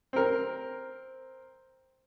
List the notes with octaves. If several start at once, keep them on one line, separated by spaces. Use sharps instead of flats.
C4 A#4